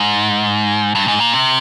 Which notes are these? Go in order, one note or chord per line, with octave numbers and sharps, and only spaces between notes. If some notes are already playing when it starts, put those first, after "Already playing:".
Already playing: G#2
G2
G#2
A#2
C3